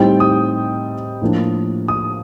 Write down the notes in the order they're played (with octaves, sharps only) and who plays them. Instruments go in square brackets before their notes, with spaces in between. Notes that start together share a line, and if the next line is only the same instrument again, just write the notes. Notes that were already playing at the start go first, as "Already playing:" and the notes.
Already playing: [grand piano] A2 G3 C4 D#4 G5
D#6
A2 F3 A#3 D4
D#6